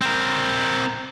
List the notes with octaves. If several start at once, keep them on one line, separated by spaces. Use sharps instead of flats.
C4 A#4